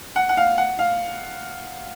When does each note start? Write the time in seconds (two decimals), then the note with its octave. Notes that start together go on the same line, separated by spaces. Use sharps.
0.16 F#5
0.29 F#5
0.37 F5
0.58 F#5
0.79 F5